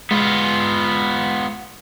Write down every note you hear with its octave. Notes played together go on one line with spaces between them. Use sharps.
G#3 B3 F4